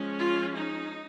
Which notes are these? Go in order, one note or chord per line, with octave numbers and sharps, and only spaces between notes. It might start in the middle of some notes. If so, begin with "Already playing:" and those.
Already playing: F3 G#3 C#4
F4
D#4